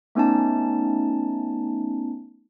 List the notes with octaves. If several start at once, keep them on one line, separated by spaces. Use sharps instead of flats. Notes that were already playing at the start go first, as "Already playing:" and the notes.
A3 B3 C#4 D#4 A5